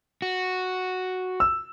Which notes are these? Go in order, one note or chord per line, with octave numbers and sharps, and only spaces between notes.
F#4
E6